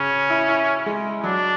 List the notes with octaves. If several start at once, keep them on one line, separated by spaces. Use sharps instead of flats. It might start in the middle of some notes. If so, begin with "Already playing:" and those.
Already playing: C#3 C#4
E4
E4
G#3
F#3 D4